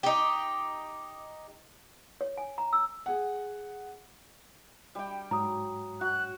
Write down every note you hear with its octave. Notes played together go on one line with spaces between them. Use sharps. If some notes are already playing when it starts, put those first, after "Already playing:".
D#4 G4
C#5
G#5
A#5
E6
G#4 F#5
G3 G5
G#2 F#3 A#5 D#6
F#4 F#6